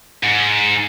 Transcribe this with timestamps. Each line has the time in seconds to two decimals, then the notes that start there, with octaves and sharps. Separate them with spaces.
0.23 G#2